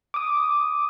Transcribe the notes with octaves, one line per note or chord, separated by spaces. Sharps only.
D6 D#6